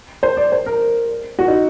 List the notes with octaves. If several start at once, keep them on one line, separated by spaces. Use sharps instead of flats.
C5
D5
C5
A#4
F#4
D#4